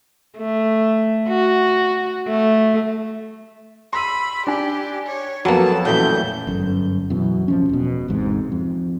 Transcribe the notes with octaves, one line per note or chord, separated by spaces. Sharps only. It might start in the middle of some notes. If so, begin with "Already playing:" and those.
A3
F#4
A3
B5 C6 E6 D#7
D4 G4 G#5
C#5
F2 F#3 A#3 B3 F#4 A4 F#5 A5
A1 A#2 E3 F#3 A4 E5 G6
G1 F#2
F#2 B2 E3
D1 F3 C#4
E1 B2
G#1 E2 G#2 C3
F2